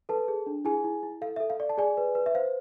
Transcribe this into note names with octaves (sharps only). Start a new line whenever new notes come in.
A4 B4 A5
G#4
D4
E4 G#4 G#5
E4
E4
A4 F5
A4 E5
F5
D5
A5
G#4 D5 G#5
B4
B4
E5
C5 F5